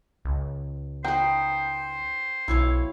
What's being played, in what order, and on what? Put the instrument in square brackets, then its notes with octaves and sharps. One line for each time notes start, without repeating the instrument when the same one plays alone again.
[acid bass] C#2
[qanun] D#4 B4 [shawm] C5 [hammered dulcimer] G5
[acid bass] B1 [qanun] E4 C#5 F5